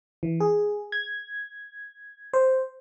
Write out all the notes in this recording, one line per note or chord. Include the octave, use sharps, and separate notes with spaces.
E3
G#4
G#6
C5